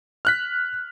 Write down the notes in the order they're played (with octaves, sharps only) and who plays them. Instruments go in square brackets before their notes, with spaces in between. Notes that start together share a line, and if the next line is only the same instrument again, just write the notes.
[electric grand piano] F6 F#6 B6